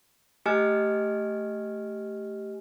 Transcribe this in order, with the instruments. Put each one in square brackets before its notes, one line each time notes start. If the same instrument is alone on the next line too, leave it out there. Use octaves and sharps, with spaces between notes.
[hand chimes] A3 G4 D#5 G#5 F6